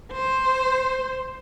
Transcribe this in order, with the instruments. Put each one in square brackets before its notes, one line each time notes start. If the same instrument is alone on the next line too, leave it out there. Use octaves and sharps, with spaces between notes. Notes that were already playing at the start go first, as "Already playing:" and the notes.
[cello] C5